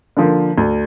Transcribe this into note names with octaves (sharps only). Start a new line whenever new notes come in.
D3 F3 A#3
D2